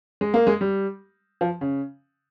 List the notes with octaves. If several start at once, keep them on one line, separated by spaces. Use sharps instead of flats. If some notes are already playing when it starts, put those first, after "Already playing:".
G#3
A#3
G#3
G3
F3
C#3